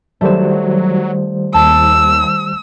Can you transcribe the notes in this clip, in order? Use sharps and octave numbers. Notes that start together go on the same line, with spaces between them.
D#3 F#3 G3 A3 C5 E7
D#2 A5 E6